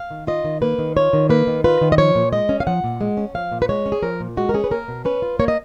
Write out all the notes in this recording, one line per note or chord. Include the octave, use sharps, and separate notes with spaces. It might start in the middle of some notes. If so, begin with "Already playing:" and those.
Already playing: F5
D#3
F4 D#5
D#3
A#3 B4
D#3
F4 C#5
D#3
A#3 B4
D#3
F4 B4
D#3
D#5
F3 C#5
A#2
G#3 D#5
C#4
F5
F3 F#5
A#2
G#3
C#4
F3 F5
A#2
B4
G#3 C#5
C#4
G#4
F3 A#4
A#2
G#3 F#4
A#4
C#4 G#4
B4
A#3 A#4
B2
C#4 B4
F4
A#3 C#5
D#5